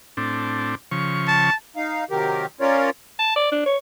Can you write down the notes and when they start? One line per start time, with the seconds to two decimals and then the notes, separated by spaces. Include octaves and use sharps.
0.17 A2 C4 D4
0.91 C#3 F3 C#6
1.28 A5
1.76 D#4 F5
2.10 C3 D#3 F#3 G4 A#4
2.61 C#4 F4 A#4 C#5 D5
3.19 A5
3.36 D5
3.52 D4
3.66 C#5